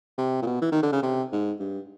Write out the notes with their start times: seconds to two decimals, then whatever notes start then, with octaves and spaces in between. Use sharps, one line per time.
0.18 C3
0.42 A#2
0.47 B2
0.61 E3
0.72 D#3
0.83 D3
0.92 C#3
1.03 C3
1.32 G#2
1.60 G2